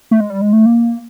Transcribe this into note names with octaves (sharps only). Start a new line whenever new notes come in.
A3
G#3
G3
G#3
A3
A#3